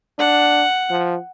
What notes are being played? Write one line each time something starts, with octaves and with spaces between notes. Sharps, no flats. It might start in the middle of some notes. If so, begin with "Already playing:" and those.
D4 F#5
F3